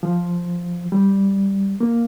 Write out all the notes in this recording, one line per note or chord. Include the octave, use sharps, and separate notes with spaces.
F3
G3
A#3